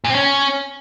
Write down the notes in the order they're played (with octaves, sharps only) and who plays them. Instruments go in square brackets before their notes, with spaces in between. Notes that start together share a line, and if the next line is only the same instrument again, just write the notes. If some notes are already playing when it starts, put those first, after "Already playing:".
[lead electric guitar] A#2
C4
C#4